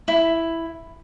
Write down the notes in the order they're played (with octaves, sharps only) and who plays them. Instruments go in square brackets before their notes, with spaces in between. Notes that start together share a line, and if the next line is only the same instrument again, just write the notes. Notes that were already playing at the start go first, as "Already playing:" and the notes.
[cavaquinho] E4